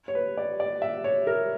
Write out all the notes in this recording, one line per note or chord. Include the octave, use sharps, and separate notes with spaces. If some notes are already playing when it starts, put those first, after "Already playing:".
C#5
B4
D5
D5
E5
C#5
A#4